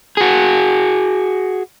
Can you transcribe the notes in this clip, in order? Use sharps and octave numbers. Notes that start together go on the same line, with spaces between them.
F#4 G#4